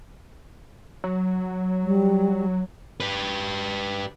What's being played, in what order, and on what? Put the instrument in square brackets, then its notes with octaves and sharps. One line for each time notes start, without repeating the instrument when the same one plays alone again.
[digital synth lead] F#3
[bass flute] G3
[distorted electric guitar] G4 B4